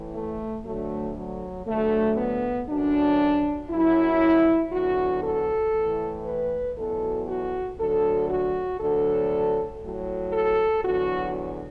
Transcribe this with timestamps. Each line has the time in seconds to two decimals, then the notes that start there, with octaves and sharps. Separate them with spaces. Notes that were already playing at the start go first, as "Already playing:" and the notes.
Already playing: A2 E3
0.14 A3
0.64 D2 D3 F#3 A3
1.16 F#3
1.67 D2 D3 F#3 A3
2.18 B3
2.68 F#2 D3 F#3 D4
3.70 F#2 F#3 E4
4.73 E2 D3 F#3 F#4
5.23 A4
5.74 A2 E3
6.25 B4
6.76 E2 B2 F#3 A4
7.27 F#4
7.78 D2 D3 F#3 A4
8.30 F#4
8.80 D2 D3 F#3 A4
9.82 A2 F#3
10.33 A4
10.84 E2 D3 F#3 F#4